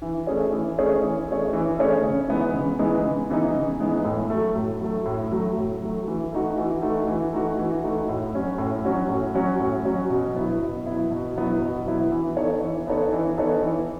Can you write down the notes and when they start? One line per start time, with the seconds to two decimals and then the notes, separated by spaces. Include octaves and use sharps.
0.02 E3
0.27 A3 C#4 G#4 C#5
0.52 E3
0.78 A3 C#4 G#4 C#5
1.03 E3
1.28 A3 C#4 G#4 C#5
1.53 E3
1.79 A3 C#4 G#4 C#5
2.03 C#3
2.28 E3 G#3 B3 D#4
2.54 C#3
2.79 E3 G#3 B3 D#4
3.04 C#3
3.30 E3 G#3 B3 D#4
3.55 C#3
3.80 E3 G#3 B3 D#4
4.05 A2
4.30 F#3 A3
4.56 A2
4.82 F#3 A3
5.06 A2
5.32 F#3 A3
5.56 A2
5.82 F#3 A3
6.07 E3
6.32 A3 D#4 F#4
6.58 E3
6.82 A3 D#4 F#4
7.08 E3
7.33 A3 D#4 F#4
7.59 E3
7.83 A3 D#4 F#4
8.09 A2
8.34 F#3 C#4 F#4
8.58 A2
8.85 F#3 C#4 F#4
9.09 A2
9.35 F#3 C#4 F#4
9.60 A2
9.84 F#3 C#4 F#4
10.10 B2
10.35 F#3 B3 E4
10.61 B2
10.86 F#3 B3 E4
11.10 B2
11.36 F#3 B3 E4
11.61 B2
11.86 F#3 B3 E4
12.12 E3
12.37 B3 D#4 A4 C#5
12.61 E3
12.87 B3 D#4 A4 C#5
13.12 E3
13.37 B3 D#4 A4 C#5
13.63 E3